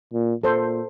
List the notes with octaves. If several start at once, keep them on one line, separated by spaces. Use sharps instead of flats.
A#2
A#2 A4 C5